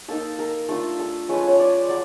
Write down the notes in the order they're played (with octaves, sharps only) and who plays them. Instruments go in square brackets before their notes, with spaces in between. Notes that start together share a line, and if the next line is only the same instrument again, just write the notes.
[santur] A#3 D#4 A4
A#4
A3 D4 F4 A4
A4
F3 G#3 C#4 B4
C#5
D5
F#3 D5